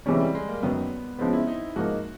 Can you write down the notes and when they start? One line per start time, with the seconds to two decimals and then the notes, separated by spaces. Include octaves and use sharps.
0.06 C3 E3 G3 G#3 C#4
0.20 G3
0.35 G#3
0.49 A#3
0.62 F#2 D#3 F#3 B3
1.19 C#3 F3 G#3 B3 C4
1.33 E4
1.47 D#4
1.76 G#2 F3 A#3 D#4 F#4